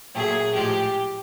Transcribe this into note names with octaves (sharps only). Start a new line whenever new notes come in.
A#2 F#3 A3 G#4
A2 F3 G#3 G4